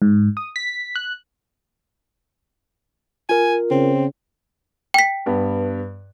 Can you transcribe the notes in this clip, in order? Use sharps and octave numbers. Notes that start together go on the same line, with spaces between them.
G#2
D#6
B6
F#6
F4 A#4 G#5
C#3 C4
G5 B6
G2 B3